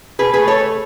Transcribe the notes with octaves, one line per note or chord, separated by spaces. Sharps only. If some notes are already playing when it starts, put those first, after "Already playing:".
B2 G#4 B4
A3 G#4 B4
A4 C#5
A3